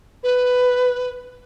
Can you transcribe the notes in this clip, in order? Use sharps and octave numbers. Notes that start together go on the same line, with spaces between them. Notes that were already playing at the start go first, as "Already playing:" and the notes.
B4